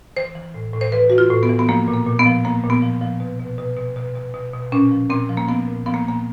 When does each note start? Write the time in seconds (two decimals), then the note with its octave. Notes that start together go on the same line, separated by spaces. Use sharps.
0.17 E3 C5
0.35 E3
0.54 A2
0.74 A2
0.81 C5
0.92 E3 B4
1.10 E3 F#4
1.18 F4
1.30 A2
1.43 B3
1.49 E3
1.59 B3
1.69 F3 A#3
1.88 A#2
1.94 A#3
2.06 A#2
2.19 B3
2.26 F3
2.44 F3 A#3
2.64 A#2
2.70 B3
2.82 F3
3.01 F3
3.20 B2
3.40 B2
3.58 B2
3.77 B2
3.96 B2
4.16 B2
4.34 B2
4.53 B2
4.72 A#2 C#4
4.91 F3
5.10 A#2 C4
5.29 F3
5.37 A#3
5.48 F3 B3
5.67 A#2
5.86 F3 B3
5.94 A#3
6.05 A#2 A#3